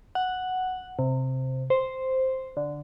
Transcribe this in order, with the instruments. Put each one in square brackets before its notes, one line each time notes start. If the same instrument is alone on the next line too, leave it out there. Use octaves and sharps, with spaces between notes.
[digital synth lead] F#5
C3
C5
D3